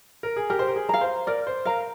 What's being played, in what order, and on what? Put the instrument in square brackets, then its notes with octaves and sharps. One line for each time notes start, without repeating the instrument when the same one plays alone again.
[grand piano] A#4
G#4
[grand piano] G4 [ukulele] A#4
[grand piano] C5
A#4
G#4
[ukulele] F5 A#5
[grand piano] C5
[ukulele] A#4 [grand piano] D5
[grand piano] C5
[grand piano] A#4 [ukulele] F5 A#5